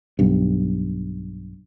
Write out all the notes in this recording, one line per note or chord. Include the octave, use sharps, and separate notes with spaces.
B1 G2